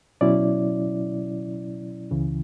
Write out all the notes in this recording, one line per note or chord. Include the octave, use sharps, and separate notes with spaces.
B2 F#3 C#4 E4 D5
C#2 C#3 E3